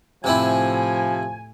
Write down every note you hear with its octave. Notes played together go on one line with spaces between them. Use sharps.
A2 C3 F3 C4 E4 G#5